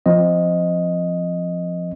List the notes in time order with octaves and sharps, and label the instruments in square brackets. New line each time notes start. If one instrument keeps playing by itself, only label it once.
[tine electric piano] F3 C4 D#5